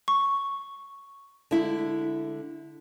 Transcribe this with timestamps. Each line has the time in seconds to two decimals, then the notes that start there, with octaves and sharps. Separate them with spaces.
0.08 C#6
1.51 D3 G#3 E4